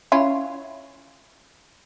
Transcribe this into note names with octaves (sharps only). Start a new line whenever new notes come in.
C#4 E4 F4